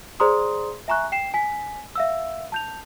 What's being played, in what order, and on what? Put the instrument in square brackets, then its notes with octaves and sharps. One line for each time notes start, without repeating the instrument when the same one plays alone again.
[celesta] G#4 C5 D5 A#5 C6 D#6
E5 G#5 A#5 C#6 F#6
G5 C7 E7
G#5 B6
E5 F5 E6
A5 G6 F7